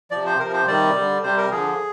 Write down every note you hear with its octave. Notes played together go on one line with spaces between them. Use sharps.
C3 F3 D5
C5
C3 F3 A#4
C5
C3 D#3 G3 D5
D3 G3
C3 G3 C5
A#4
D3 F3 G#4